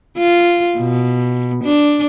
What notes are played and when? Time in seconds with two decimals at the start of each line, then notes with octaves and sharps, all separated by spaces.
0.18 F4
0.78 B2
1.64 D4